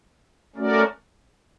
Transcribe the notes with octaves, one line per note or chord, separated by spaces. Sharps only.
A3 C#4 F#4 A#4 D5